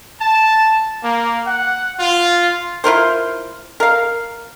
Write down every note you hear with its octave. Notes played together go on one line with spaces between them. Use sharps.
A5
A#3
F#5
F4
E4 F4 A#4 C5
A#4 F5